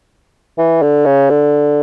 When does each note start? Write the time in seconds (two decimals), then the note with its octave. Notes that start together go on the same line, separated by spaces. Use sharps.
0.58 E3
0.82 D3
1.06 C#3
1.30 D3